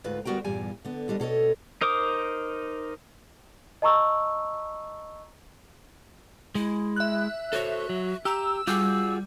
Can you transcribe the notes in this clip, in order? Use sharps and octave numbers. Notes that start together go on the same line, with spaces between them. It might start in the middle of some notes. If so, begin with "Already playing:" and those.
D2 G#2 F4 B4
D2 G3 B3 F#4 A#4 G5
E2 G2 A#2 G3 G#5
D3 B3
D2 G3 D4 D#5
B2 A4 C#5 D#5
D#4 A#4 C5 D6 D#6
D#5 A5 A#5 C#6 E6
G#3 E4
E5 F#6
F#4 A4 C5 C#5
F#3
G4 A#5 E6
G3 F4 F#4 G#4 E6